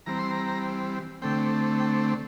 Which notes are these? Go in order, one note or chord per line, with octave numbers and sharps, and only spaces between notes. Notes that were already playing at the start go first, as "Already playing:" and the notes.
E3 G3 C4 A#5
C6
A#5
D3 A3 C4 G5
G5